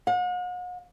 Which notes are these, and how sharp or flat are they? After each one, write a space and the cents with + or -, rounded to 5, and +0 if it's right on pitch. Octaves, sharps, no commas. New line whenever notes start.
F#5 -45